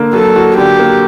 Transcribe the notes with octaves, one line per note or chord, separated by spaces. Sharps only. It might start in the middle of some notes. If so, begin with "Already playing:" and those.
Already playing: D3 A#3
F#3 A4
F#4
D3 G4
A#3